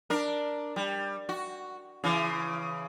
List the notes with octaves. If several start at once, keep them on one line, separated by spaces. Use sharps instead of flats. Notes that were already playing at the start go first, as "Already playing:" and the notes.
D4 A#4
G3
F#4
C#3 E3